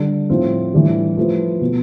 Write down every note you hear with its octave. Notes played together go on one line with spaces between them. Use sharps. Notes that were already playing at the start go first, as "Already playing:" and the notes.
Already playing: D3 G3 D4 G4
A2 F3 C4 F4
A2 E3 G3 D4 G4
F3 A3 E4 B4
B2 B3